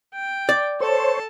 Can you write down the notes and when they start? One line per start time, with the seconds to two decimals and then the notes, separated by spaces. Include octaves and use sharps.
0.14 G5
0.49 D5
0.80 A4 C5 C#5 A5